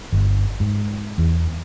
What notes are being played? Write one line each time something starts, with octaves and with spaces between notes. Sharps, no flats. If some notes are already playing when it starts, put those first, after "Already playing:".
G1
G#2
E2